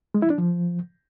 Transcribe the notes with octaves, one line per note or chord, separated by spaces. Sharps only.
G#3
E4
D4
F3